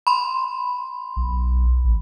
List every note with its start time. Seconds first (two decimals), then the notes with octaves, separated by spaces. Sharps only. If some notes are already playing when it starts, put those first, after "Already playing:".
0.07 B5 C6
1.17 B1
1.84 A1